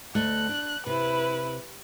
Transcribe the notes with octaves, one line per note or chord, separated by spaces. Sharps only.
D2 A3 D#5 F#6
D4
C3 E4 B4